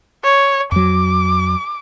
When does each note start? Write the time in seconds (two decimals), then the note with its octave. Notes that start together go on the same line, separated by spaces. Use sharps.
0.24 C#5
0.72 F2 F#3 D6